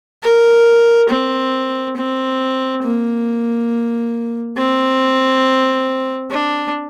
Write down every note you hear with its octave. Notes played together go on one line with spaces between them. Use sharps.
A#4
C4
C4
A#3
C4
D4